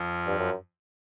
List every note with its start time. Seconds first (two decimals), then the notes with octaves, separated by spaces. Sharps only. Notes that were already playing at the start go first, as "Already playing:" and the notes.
Already playing: F2 F3
0.27 G2
0.39 F#2